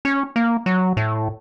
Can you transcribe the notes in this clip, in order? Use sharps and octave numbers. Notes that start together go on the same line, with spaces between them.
C#4
A#3
F#3
A2